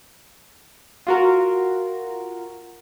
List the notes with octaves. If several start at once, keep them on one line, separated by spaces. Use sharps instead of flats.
F4 F#4 A#4